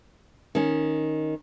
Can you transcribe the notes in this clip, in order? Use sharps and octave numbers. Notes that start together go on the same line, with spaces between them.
D#3 C#4